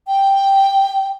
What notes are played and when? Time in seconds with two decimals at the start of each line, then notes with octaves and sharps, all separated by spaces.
0.07 G5